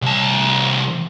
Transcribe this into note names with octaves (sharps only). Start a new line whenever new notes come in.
C2 A5